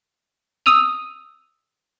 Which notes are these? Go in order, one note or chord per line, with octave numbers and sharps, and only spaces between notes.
D#6 E6 D#7 F7